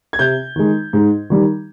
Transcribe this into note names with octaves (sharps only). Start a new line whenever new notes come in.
G#6
C3 G6
D#3 G#3
G#2
D#3 G3